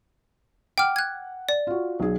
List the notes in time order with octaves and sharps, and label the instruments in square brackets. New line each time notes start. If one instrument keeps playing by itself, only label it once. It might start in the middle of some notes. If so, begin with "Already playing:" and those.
[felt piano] F#5 [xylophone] G5 D6 F6
[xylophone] F#6 G#6
D5
[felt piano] F4 F#4
B1 G#4